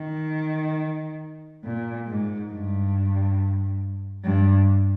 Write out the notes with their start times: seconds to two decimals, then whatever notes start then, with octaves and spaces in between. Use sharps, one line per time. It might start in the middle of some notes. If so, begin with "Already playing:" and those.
Already playing: D#3
1.64 A#2
2.07 G#2
2.51 G2
4.24 G2